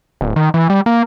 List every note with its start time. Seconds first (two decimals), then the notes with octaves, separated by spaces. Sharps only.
0.21 D1
0.36 D#3
0.54 E3
0.70 G3
0.86 A#3